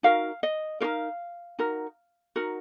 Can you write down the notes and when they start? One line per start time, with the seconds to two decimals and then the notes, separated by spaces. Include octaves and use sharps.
0.03 D#4 F#4 A#4 F5
0.43 D#5
0.80 D#4 F#4 A#4 F5
1.59 D#4 F#4 A#4
2.36 D#4 F#4 A#4